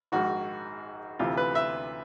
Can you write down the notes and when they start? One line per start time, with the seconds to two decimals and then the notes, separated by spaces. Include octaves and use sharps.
0.12 A#1 G#2 D#3 F#4
1.19 D2 C3 E3 F4
1.37 B4
1.55 E5